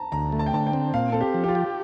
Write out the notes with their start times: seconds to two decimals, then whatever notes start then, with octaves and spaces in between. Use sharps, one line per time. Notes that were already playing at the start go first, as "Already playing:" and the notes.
Already playing: A5 A#5
0.12 D2 A#5
0.32 A3
0.39 A5
0.46 G5
0.53 D3 A5
0.67 G5
0.73 C4
0.94 A#2 F5
1.12 C4 A4
1.21 G4
1.34 F3
1.44 G4
1.48 F4
1.55 G4